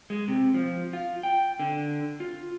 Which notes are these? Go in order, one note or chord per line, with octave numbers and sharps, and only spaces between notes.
G#3
C3
F3
F4
G5
D3
F4